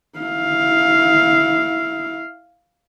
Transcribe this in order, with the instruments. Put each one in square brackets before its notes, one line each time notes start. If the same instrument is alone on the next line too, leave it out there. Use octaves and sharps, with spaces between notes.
[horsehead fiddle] E4 F5